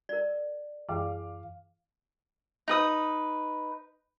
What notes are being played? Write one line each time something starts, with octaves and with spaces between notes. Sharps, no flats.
A#4 D5
F#2 E3 G#4 F5 D6
D#4 B4 D#6